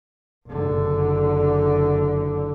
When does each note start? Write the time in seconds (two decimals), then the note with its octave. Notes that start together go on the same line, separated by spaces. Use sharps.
0.46 F#1 D3